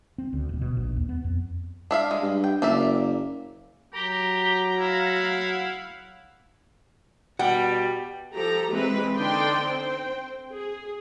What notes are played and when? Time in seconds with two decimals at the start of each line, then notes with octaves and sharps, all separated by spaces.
0.18 C4
0.33 D2
0.49 D#1
0.61 B2
0.77 A#1
0.96 D#2
1.09 B3
1.24 F2
1.91 D4 E5 F5
2.11 G#3
2.23 G2
2.44 G5
2.62 F#1 A#3 D5 E5
3.94 F#3 G4 A#5
4.77 E4 F5 F#5
7.39 B2 G3 F#5 G5
8.34 F3 G4 A4 A#5
8.70 E3 G#3 C4 B4
9.17 D3 D4 D#4 D5 G5 C6
9.61 C4 C5 G5
10.54 G#4